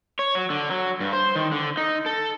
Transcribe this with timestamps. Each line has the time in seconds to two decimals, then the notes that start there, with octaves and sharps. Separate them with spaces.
0.19 C#5
0.35 F#3
0.50 D3
0.70 F#3
1.00 G2
1.13 C5
1.36 D#3
1.52 D3
1.77 D#4
2.06 A4